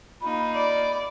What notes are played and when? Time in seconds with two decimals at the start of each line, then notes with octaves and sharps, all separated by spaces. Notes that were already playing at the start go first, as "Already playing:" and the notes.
0.22 A#3 D#4 F4 B5
0.54 D5